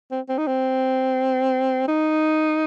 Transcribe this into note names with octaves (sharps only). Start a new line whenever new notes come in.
C4
C4
D#4
C4
D#4